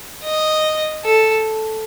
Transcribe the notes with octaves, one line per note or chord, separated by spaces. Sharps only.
D#5
A4